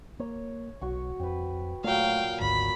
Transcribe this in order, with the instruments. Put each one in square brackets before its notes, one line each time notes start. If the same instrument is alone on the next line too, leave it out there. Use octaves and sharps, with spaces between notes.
[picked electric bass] A#3 [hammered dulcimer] C#5
[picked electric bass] B1 [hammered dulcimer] F#4 C#6
[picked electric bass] F2 [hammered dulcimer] B4 G5
[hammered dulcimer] A#2 F#3 [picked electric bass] A3 [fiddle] F5 G5
[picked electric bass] G#1 D2 G#2 [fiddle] B5